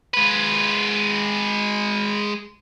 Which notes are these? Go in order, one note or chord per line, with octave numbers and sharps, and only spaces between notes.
G#3 B4